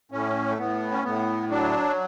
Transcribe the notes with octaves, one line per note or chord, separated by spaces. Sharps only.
A2 C#4
A3
A2 B3
C#4
A2 B3
F#3 D4